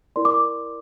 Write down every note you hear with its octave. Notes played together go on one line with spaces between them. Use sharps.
E4 A#4 D5 C6
D6